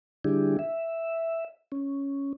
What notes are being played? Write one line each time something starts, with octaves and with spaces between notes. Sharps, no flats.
D3 G3 D4 E4 G4 G#4
E5
C#4